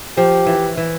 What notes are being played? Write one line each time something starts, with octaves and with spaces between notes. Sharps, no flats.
F3 G4
E3
E3